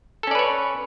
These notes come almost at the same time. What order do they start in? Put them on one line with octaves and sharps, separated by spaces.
A4 C#4 D5 B4 C#5